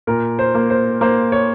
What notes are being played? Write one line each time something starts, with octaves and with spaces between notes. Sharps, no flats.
A#2 A#4
C5
A#3
C5
A#3 C5
C#5